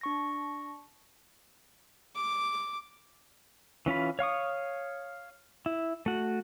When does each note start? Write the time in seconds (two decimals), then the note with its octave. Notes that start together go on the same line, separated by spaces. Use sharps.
0.01 D4 C#6 A#6
2.15 D6
3.86 E3 C#4 F4 B5
4.19 C#5 F5 C#6 D#6
5.66 E4
6.06 A3 F#4